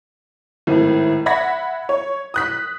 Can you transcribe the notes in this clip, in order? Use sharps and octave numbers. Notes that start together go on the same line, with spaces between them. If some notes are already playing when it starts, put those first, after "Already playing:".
G#1 A2
E5 F#5 B5 G#6 A#6 B6
C#5
D#6 F#6 B6